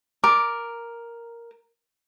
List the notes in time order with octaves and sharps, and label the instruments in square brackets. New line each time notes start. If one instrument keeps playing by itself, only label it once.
[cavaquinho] A#4 [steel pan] D6